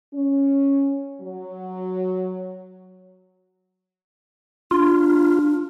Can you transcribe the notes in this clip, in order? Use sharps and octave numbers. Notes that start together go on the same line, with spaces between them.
C#4
F#3
D4 F4